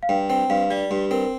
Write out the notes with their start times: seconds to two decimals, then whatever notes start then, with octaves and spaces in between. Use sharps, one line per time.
0.03 F5
0.09 G2 G5
0.29 C4 G5
0.50 G2 F5
0.70 G3 D5
0.91 G2 G4
1.11 C4 A#4